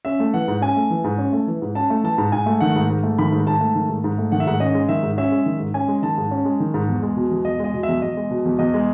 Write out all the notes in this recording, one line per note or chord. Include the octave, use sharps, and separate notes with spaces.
C#4 E5
A3
E3 F#5
G#2
C#4 G#5
A3
E3
G#2
C#4
A3
E3
G#2
C#4 A5
A3
E3 A5
G#2
G#2 G#5
A3
D#3 F#5
G#2
G#2
A3
D#3 B5
G#2
G#2 A5
A3
D#3
G#2
G#2
A3
D#3 F#5
E5
G#2 F#5
C#4 D#5
G#3
D#3 E5
G#2
C#4 E5
G#3
D#3
G#2
C#4 G#5
G#3
D#3 A5
G#2
C#4
G#3
D#3
G#2
E2
G#3
B2
E2
E2 D#5
G#3 D#5
B2
E5
E2
E2 D#5
G#3
B2
E2
E2 D#5
G#3